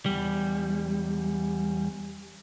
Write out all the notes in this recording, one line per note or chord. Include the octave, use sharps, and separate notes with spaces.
E2 G3